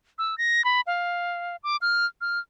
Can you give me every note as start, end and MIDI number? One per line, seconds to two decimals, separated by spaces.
0.18 0.38 88
0.38 0.64 94
0.65 0.81 83
0.87 1.56 77
1.64 1.77 86
1.82 2.06 89
2.21 2.39 89